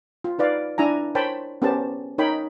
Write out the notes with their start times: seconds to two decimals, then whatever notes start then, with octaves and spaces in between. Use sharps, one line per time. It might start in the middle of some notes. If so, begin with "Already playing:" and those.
0.24 F4
0.39 D#4 B4 D5 F5
0.78 D4 E4 G#5 A#5
1.15 A#4 C5 C#5 G5 A5 B5
1.62 B3 C#4 G4 A#4 C5 A5
2.18 D#4 A#4 C#5 G5 B5